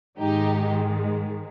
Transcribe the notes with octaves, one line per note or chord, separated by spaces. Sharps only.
G#2 D#3 G#3 D#4 G4